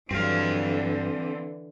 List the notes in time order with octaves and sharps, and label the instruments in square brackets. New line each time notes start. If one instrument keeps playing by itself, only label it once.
[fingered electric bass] G2 F#3 [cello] D3 E3 [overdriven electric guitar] C4 F5